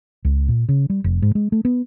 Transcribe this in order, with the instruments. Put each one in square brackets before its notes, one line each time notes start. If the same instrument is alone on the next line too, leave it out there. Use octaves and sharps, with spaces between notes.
[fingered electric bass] C#2
A#2
C#3
G3
F1
G#2
G#3
A3
B3